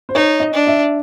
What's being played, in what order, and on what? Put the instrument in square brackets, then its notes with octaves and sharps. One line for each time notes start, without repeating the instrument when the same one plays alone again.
[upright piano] C5
[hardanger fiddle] D#4 [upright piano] C#5
[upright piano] D#5
[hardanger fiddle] D4
[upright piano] E5